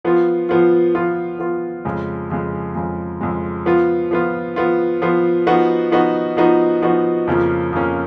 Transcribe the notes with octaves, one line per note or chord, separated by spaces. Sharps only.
F3 B3 F4
F3 B3 F4
F3 B3 F4
F3 B3 F4
F2 C#3 G#3
F2 C#3 G#3
F2 C#3 G#3
F2 C#3 G#3
F3 B3 F4
F3 B3 F4
F3 B3 F4
F3 B3 F4
F3 B3 D#4 F#4
F3 B3 D#4 F#4
F3 B3 D#4 F#4
F3 B3 D#4 F#4
F2 C#3 F3 A#3 C#4
F2 C#3 F3 A#3 C#4